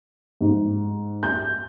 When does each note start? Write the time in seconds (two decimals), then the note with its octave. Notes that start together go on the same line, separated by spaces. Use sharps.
0.41 G#2
1.23 G6